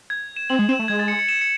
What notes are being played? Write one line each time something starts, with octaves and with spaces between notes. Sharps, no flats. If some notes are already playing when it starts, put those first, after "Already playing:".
G#6
E7
C4 F#7
G#3
C4 E7
A3
G#3 G#6
A6
C#7
C#7
E7
C#7